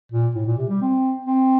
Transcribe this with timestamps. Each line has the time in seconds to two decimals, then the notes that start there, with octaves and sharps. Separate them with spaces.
0.12 A#2
0.35 A2
0.46 A#2
0.57 C3
0.69 G3
0.81 C4
1.26 C4